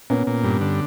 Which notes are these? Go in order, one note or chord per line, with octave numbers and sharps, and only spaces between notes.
A#2 B3 C#4
A#2
G2
D3